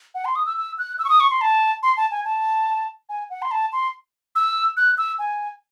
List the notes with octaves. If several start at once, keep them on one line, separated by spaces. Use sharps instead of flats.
F#5
C6
D#6
E6
E6
F#6
E6
C#6
D#6
C#6
C6
A5
C6
A5
G#5
A5
G#5
F#5
C6
A5
C6
E6
F#6
E6
G#5